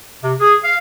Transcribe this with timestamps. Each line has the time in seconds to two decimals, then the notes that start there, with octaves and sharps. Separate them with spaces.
0.23 C3
0.40 G#4
0.64 F5